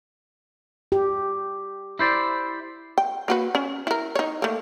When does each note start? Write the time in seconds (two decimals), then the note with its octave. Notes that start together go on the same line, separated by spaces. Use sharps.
0.92 G4
1.99 E4 C5 D5
2.98 G5
3.28 A#3 F#4 B4
3.55 C#4
3.87 E4 A#4
4.15 D#4 C#5
4.42 A3 A#3